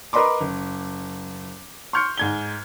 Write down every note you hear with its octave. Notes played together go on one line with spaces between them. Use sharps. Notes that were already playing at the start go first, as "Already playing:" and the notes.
A#4 B4 D#5 B5 C6 D6
F#1
C6 C#6 F6 G6 C#7
G#2 G#6 G7